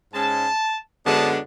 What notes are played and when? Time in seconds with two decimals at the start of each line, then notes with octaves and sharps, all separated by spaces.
0.13 G#2 G#3 C#4 A5
1.05 F#2 D3 G#3 B3 D4 A5